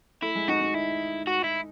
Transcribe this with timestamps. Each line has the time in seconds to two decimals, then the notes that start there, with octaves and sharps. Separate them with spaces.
0.23 A3 E4
0.35 G#3
0.48 D#4 F#4
0.61 D#4
0.75 E4
1.27 F#4
1.44 E4